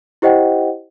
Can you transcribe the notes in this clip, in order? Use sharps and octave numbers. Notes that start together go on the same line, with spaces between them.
E4 G4 C5 D#5 F#5 G5